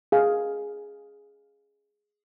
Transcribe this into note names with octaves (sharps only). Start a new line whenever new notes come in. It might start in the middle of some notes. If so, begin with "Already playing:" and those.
G#4 F5